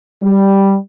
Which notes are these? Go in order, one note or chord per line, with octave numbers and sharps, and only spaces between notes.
G3